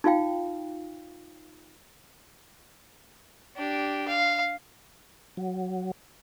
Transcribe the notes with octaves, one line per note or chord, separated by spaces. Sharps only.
D#4 F4 F5 G5
D4 G4
F5
F#3